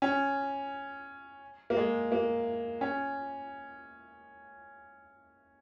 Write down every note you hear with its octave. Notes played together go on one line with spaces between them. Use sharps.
C#4
A#3
G#3
A#3
C#4